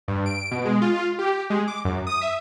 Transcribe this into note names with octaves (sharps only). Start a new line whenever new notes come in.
G2
D7
B2
G#3
F4
G4
G#3
D6
F#2
D#6
E5